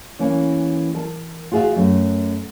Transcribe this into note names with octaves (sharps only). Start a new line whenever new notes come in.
E3 A#3 C#4
A#4 A5
F4 F#4 G#4 A4 E5 F5
F#2 A3 C#4